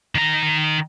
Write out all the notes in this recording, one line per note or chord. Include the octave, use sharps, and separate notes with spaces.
D#3 A#5